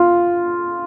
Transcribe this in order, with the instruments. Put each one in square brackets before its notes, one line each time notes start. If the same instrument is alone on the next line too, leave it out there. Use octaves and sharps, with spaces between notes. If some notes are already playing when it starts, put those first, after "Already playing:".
Already playing: [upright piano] F4